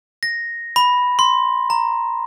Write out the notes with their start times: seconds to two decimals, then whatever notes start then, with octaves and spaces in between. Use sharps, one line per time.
0.23 A#6
0.76 B5
1.19 C6
1.70 A#5